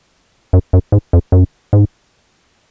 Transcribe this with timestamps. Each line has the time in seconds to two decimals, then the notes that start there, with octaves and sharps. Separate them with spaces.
0.53 F#2
0.73 F#2
0.92 G#2
1.13 F2
1.32 F#2
1.73 G#2